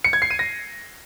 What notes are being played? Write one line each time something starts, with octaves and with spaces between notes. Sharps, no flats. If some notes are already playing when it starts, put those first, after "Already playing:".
C#7
G#6
C7
D#7
A#6